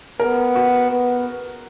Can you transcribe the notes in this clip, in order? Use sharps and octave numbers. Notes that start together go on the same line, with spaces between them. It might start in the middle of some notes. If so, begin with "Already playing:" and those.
B3 A#4
F#4
B3